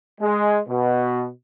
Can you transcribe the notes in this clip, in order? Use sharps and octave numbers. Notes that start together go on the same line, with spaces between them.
G#3
B2